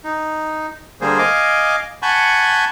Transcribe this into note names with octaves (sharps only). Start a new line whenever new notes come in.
D#4
D3 G3 A#3 G#4 C5
D#5 F5 G#5 D6
F#5 G#5 A5 B5 C#6 G6